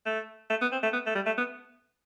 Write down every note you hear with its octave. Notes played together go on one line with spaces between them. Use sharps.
A3
A3
B3
C4
A3
B3
A3
G3
A3
B3